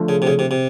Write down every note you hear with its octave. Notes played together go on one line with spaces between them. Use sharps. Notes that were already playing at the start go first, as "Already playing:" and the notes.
Already playing: D3 F3 A3
C#3
C3
C#3
C3
C3